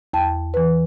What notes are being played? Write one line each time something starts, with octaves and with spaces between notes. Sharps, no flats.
E2 G5 A5
E3 B4